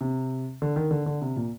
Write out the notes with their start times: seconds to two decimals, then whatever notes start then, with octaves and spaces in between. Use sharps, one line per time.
0.01 C3
0.62 D3
0.76 D#3
0.91 D3
1.06 D3
1.22 C3
1.37 A#2